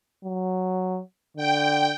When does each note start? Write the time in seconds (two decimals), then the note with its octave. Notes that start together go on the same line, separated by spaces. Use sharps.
0.24 F#3
1.37 D3 G5